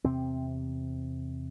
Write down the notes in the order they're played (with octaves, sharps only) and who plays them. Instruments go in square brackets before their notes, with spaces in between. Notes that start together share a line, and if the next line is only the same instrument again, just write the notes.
[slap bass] E2 C3 C4